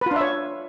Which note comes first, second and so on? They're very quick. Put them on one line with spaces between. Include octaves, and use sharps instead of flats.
B4 F4 D4 E5 C#5